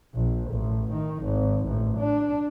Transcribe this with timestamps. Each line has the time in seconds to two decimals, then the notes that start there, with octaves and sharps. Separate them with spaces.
0.15 A#1
0.52 A1
0.93 D#3
1.24 G#1
1.66 A1
1.98 D4